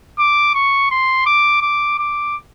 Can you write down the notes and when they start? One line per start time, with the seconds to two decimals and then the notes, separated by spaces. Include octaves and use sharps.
0.19 D6
0.54 C#6
0.91 C6
1.26 D6
1.61 D6
1.99 D6